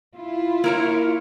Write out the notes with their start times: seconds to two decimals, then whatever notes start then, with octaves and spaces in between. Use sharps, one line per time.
0.16 E4 F4
0.64 A#3 A#4 C#5